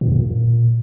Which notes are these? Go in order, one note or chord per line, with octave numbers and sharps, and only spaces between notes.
A#2
F2
A#2